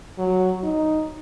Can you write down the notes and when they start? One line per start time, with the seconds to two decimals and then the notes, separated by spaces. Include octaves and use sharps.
0.18 F#3
0.63 D#4